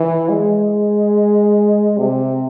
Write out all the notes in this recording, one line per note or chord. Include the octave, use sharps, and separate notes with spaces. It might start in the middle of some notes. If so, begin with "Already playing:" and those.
Already playing: E3
G#3
C3